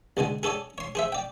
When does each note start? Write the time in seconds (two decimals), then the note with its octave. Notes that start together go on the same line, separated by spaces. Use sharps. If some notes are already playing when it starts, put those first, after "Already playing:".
0.17 C2 D3 G#3 G#5
0.43 G#4 A4 C#5 D5 G#5
0.78 C#5 C6
0.95 G#4 C5 E5
1.12 D5 G5